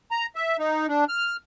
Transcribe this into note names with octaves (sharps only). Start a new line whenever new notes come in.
A#5
E5
D#4
D4
F6